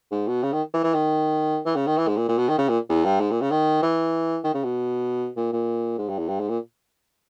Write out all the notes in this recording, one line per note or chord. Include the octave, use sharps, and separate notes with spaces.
G#2
B2
C#3
D#3
E3
E3
D#3
E3
C#3
D#3
E3
G#2
A#2
A#2
B2
D#3
C#3
A#2
E2
G2
G#2
A#2
C#3
D#3
E3
D#3
C#3
B2
A#2
A#2
G#2
G2
E2
G2
G#2
A#2